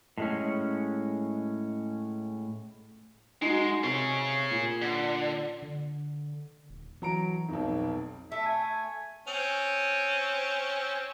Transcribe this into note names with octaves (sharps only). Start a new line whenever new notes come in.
A2 G#3 C#4
G#3 D#4 F#4
C3 G#4 C#5
A#2
D3
D3
D#1
E3 F#3 A#5 D7
F1 B1 D#4
A3 E5
G#5
C4 C#4